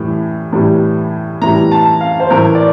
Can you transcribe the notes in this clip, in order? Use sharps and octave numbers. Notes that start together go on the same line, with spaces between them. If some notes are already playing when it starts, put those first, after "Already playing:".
Already playing: A2 E3 G3
A2 E3 G3
A2 E3 G3 A#5
A5
F5
C5
A2 E3 A3 A#4
D5